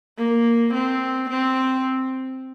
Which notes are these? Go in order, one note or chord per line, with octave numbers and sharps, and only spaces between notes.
A#3
C4
C4